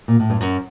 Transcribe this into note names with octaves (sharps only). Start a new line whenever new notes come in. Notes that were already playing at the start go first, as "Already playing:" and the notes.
A#2
A2
G2
F#2